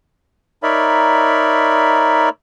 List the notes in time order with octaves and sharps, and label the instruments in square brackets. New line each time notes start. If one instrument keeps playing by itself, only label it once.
[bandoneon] D#4 A#4 C#5 D5 E5 B5